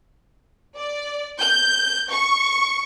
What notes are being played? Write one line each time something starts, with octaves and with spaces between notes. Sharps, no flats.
D5
G6
C#6